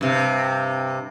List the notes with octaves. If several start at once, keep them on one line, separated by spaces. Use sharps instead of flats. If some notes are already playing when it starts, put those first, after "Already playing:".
G2 C3